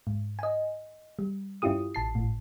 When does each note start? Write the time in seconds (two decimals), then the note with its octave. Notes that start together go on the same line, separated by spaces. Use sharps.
0.07 G#2
0.39 D#5 G#5
1.19 G3
1.62 G2 C#4 E4 F4 G4 D#6
1.95 A1 A5 C7
2.15 G#1 A2